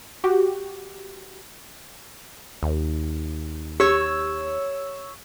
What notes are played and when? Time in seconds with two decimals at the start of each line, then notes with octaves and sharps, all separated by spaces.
0.24 F#4 G4
2.63 D#2
3.80 G4 C#5 E6